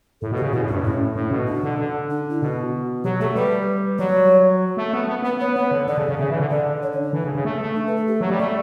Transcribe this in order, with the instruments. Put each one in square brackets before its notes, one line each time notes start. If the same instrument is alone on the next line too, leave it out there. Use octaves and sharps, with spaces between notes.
[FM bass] A2 [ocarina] A4
[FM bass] B2
[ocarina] G4
[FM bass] C#3
[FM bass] B2 [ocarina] E4
[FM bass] A2
[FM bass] G2 [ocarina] D4
[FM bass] A2 [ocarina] C#4
[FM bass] A2 [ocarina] C#4
[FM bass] B2
[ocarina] D4
[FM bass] D3
D3
[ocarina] D4
E4
[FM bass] B2 [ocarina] F#4
[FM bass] F#3 [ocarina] G4
[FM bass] A3 [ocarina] A4
[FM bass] G3 [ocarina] B4
[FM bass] F#3 [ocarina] C#5
[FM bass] A3
B3
B3
B3
[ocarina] B4
[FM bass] B3 [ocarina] C#5
[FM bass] B3 [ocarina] C#5
[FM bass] D3
[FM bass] D3 [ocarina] D5
[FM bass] C#3
C#3
[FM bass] C#3 [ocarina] E5
[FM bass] E3
D3
[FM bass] D3 [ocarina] D5
[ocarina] C#5
D4
D4
[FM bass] E3
C#3
C#3
A3
A3
[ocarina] D4
B4
A4
G4
[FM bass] F#3
G3
[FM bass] A3 [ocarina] D5